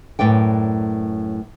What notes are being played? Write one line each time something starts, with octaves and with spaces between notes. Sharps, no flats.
F#2 A2 B4 D5 G5